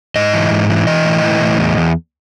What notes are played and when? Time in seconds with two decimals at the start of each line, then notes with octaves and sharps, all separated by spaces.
0.16 G#2 D#5
0.33 E3
0.51 G#2
0.69 E3
0.87 E3 D#5
1.05 A2
1.23 E3
1.41 A2
1.59 E2
1.77 E2